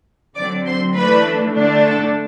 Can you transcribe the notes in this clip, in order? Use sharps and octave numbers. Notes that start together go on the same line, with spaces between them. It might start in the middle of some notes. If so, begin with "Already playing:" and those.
D3 F#3 C4 D5 D6
C5 C6
E3 A3 D4 B4 B5
D3 A3 D4
A4 A5